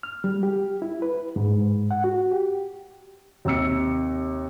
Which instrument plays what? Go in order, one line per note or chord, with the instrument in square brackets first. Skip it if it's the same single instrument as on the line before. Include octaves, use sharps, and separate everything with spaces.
[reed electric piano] F6
G3
G4
E4
B4
G#2
F#5
F#4
G4
[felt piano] D#2 C3 E6 C#7